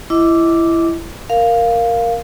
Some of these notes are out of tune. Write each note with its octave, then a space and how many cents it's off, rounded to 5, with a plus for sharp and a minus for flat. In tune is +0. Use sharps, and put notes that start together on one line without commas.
E4 +20 D#5 +30 D6 -10
A#4 +0 F5 +0